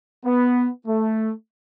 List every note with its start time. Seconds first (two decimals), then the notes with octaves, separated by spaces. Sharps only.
0.25 B3
0.87 A3